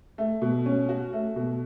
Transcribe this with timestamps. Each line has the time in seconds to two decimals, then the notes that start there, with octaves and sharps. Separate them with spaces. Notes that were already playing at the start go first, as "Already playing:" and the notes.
0.18 A3
0.42 B2
0.66 C#4
0.89 F#4
1.13 A3
1.36 B2